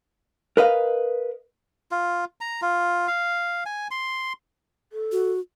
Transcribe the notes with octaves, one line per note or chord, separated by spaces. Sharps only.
A#4 B4 D#5 F5
F4
A#5
F4
F5
G#5
C6
A4
F#4